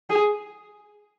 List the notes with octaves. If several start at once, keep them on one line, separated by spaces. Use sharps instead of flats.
G#4